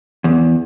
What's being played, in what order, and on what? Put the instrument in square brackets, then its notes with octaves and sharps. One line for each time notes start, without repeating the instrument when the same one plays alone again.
[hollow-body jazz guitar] E2